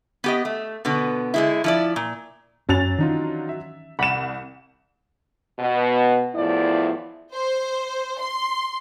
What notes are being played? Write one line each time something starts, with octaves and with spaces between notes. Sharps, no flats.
B3 G4 D#5
A3
B2 D3 B3
D3 G#3 E4
F3 E4 D5
A#2
F#2 F#3 C#4 A6 F7
D#3 E3 D4 D#4 F4
E5
C2 F#5 B5 E7
B2
E2 A2 F3 E4 D5
C5
C6